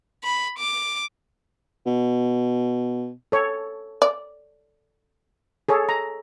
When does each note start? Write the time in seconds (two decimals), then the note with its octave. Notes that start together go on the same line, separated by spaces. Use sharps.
0.24 B5
0.59 D6
1.86 B2
3.32 A4 C#5
4.02 D5
5.69 G#4 A4 C#5
5.89 A#5